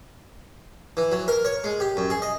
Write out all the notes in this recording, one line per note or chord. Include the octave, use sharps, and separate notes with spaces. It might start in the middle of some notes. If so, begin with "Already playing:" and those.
E3
F#3
A#4
C#5
G#3
G4
F#2
G#4
D#5